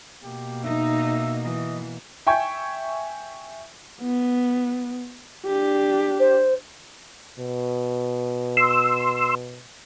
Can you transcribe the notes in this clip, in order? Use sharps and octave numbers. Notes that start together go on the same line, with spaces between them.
B2 A#3 G4
D#4 E5
E3 D#5
E5 G5 G#5 C#6 G6 G#6
B3
D4 G4
C5
B2
C6 E6